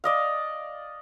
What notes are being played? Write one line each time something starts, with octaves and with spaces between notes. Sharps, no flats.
D5 D#5 F5